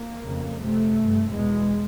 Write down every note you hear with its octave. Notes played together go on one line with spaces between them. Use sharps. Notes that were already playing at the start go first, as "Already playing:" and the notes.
Already playing: A#3
F2 C#3
F2 C3 A3
G2
E2 B2 G#3